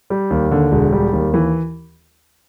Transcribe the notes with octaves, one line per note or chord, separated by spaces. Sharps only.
G3
D#2
D3
E1
G3
D#2
E3